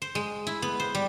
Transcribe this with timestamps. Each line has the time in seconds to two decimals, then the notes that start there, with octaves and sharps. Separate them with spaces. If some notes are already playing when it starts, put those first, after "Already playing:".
0.02 C5
0.15 G#3
0.47 E4
0.62 B3
0.80 C5
0.95 G3